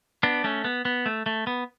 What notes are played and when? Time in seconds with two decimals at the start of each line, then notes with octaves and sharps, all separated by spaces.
0.23 B3 D4
0.44 A3 C#4
0.65 B3
0.85 B3
1.06 A3
1.26 A3
1.47 B3